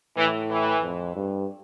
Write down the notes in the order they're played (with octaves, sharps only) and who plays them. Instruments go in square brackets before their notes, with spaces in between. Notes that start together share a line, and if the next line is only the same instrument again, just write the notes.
[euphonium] A2 [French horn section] E3
[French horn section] E3
[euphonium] F2
G2